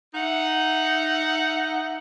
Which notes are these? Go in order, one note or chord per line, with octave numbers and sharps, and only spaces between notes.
D#4 E5 F#5